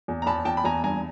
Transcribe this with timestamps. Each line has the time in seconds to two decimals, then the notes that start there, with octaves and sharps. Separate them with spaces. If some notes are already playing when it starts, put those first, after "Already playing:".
0.08 E2
0.22 A#5
0.26 E2 A5 B5
0.45 E2 G5 A5
0.57 B5
0.64 E2 G#5 A#5
0.84 G2 G#5 A#5